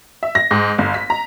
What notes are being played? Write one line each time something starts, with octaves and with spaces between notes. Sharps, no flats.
E5
A#6
G#2
G1
B6
A#5